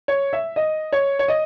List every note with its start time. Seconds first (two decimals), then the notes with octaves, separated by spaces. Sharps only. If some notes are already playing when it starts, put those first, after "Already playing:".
0.08 C#5
0.33 E5
0.56 D#5
0.93 C#5
1.19 C#5
1.28 D#5